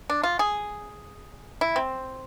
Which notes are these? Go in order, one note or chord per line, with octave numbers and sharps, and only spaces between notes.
D4
F4
G#4
E4
C4